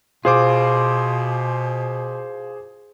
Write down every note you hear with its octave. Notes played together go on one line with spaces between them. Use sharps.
B2 F4 G#4 C5 D6